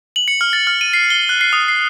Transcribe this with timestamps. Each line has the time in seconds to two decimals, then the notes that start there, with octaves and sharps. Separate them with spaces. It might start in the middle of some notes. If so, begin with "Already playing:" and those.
0.16 F#7
0.28 C#7
0.41 F6
0.53 A6
0.67 F6
0.81 D#7
0.93 C7
1.10 G7
1.29 F#6
1.41 C7
1.53 D#6
1.68 C7